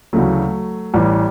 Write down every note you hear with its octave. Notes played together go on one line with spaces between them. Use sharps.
D2 C#3 E3 F#3 A3
A1 A2 E3 G3